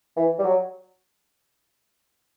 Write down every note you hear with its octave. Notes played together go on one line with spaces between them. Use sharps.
E3
G3
F#3